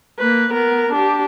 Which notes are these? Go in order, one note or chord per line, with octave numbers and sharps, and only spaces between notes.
A#3 B4
B3 A#4
D4 G4